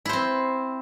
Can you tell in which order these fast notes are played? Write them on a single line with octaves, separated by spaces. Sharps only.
E4 C5 C4